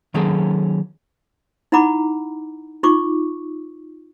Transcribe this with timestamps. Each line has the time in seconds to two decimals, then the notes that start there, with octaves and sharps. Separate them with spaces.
0.14 D#3 F#3 A#3 C#4 G#4 A4
1.72 D#4 E4 F#5 A#5 B5 D6
2.83 D#4 F4 C#6 D6